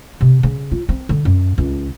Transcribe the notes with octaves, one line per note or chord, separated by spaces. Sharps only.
C3
C#3
F4
C4
D3
F#2
C#2